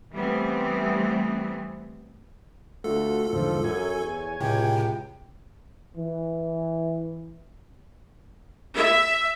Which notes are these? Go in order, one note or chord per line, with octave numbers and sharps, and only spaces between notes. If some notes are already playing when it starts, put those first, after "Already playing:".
E3 G3 A3 B3 C4
D2 A3 F4 F#4 A4
E2 G#2 D3 F3
F#2 C#5 G#5
E2
C#2 A2 C3 G5
E3
E5